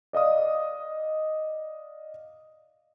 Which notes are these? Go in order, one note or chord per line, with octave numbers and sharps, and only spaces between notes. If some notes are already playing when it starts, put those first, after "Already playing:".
D5 D#5 F5 D#6